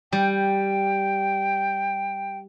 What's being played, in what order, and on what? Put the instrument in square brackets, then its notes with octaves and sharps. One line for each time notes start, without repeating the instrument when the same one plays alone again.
[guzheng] G3 [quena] G5